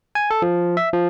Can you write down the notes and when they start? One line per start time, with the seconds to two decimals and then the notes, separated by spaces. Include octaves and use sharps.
0.15 G#5
0.31 A4
0.42 F3
0.77 E5
0.93 F3